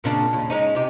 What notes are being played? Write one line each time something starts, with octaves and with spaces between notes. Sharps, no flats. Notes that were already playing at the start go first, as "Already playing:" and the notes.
A#2 C#3 D4
D#2 C#3
G#3 C#4 D#4
C3 G4